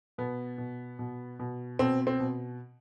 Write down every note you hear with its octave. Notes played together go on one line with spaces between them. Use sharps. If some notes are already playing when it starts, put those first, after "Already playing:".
B2 B3
B2
B2
B2
B2 C4
C4
B2